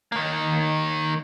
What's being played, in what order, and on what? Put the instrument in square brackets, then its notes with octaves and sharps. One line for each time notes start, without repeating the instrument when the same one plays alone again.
[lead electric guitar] D#3 A#3